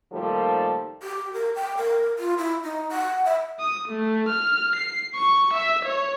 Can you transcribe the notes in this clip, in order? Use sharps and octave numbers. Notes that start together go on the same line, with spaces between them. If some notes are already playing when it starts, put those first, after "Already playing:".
A#2 D#3 F3 G3 A3 A4
G4
A#4
G5
A#4
F4
E4
D#4
F#5
E5
D#6
A3
F6
C7
C#6
E5
C#5